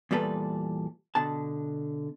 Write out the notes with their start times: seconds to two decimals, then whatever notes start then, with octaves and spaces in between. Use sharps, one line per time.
0.11 E2 A#2 G3 A4 B4
1.15 B2 D3 A5